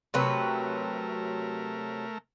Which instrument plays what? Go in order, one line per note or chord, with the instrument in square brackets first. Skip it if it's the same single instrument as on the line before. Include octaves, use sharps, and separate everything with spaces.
[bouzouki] C3 F#3 B4 [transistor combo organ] A3 A#4